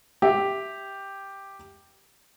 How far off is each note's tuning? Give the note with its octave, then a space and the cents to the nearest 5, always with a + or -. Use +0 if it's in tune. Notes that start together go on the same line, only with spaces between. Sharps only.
G4 +0 E5 +0